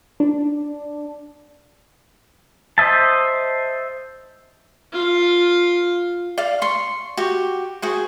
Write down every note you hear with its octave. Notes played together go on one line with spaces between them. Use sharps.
D4
C5 D#5 E5 A5
F4 F5
D5 F5
C6 C#6
F#4 G4
F#4 G#4 C5